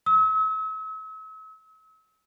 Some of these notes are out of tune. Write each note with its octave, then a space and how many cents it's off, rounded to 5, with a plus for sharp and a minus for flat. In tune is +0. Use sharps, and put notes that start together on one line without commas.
E6 -40